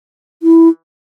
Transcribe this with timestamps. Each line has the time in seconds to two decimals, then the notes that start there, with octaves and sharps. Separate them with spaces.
0.43 E4